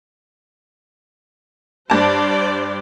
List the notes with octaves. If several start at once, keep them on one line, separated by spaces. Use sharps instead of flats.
G2 C5 D5 A5